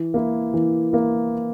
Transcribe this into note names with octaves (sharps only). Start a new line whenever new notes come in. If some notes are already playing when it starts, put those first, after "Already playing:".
Already playing: E3
A#3 E4
E3
A#3 E4